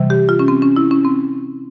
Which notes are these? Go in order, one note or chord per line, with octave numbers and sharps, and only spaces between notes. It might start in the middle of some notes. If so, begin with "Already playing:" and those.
Already playing: C3 E3 G3
G4
F4
C#4
C4
C#4
E4
C#4
C4